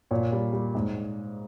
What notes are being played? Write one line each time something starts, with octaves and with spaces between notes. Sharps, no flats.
A#2 C#5
G3
G3
G#2